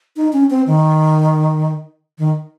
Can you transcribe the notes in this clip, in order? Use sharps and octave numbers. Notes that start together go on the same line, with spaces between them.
D#4
C#4
C4
D#3
D#3